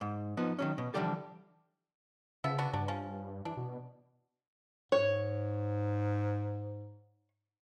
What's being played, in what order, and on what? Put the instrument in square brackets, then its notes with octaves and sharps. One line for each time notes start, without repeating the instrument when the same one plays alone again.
[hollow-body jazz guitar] G#2
F3 B3 D#4
D#3 F#3 C#4
B2
D3 E3 F3 G3 G4 A4
[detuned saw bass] C#3 [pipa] F3 B3 E5
[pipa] B3 D4 F#4
[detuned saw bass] G2 [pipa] F#3 D4
[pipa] F3 C#4
[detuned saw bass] E3 [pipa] D4
[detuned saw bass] B2
[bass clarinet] G#2 [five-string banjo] C#5